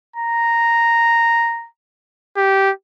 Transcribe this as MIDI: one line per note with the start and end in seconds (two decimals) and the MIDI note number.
0.16 1.68 82
2.36 2.71 67